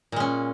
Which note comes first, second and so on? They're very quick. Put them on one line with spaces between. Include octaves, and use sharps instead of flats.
A#2 G#3 C#4